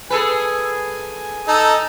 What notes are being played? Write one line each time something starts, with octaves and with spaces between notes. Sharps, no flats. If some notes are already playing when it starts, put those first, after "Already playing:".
G#4 A4 B4 G#5
D#4 A4